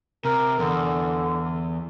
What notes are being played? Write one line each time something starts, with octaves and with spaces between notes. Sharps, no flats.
C3 A#4
E2 D3